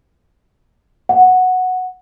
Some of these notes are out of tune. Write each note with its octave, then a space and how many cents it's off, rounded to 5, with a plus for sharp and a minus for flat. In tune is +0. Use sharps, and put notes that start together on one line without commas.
F#5 -5